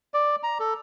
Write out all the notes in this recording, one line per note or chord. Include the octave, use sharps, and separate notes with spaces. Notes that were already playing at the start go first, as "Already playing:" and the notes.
D5
A#5
A4